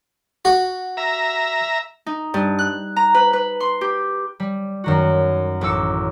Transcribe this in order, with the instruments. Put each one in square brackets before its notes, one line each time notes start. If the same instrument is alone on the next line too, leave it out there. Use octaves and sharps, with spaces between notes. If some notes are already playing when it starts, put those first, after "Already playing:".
[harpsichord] F#4
[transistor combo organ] E5 A#5
[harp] D#4
G2
F#6
A#5
B4
B4
C6
G4
G3
F#2 D#3 F#4
A1 D6 E6 C#7